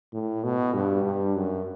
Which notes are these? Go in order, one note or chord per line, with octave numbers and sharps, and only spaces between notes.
A2
B2
G2
G2
F#2